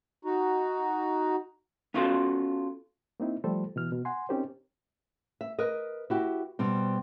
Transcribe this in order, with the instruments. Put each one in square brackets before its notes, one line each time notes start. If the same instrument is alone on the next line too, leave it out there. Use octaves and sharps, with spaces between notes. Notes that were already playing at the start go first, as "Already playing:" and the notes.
[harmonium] D#4 F#4
[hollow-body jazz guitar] B3 C#4 F4 F#4 A4 C5
[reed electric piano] A#3 C4 D#4 E4
F3 G3 A3 G4 A4 C5
B2 E3 F6
B2
F#5 G#5 C6
C4 C#4 D#4 G4 A#4 C5
[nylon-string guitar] E5
A#4 B4 D#5
E4 F#4 G4
B2 G3 C4